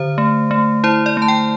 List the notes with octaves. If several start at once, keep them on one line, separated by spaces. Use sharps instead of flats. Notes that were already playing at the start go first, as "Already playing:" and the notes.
Already playing: D3 C5
A3
A3
E4 C5
D5
A3 A5
G5